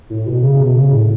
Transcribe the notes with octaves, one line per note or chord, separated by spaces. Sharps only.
A2
B2
C#3
B2
C#3
A2